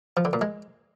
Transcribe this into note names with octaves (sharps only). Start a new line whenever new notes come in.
F3
D3
A#2
G#3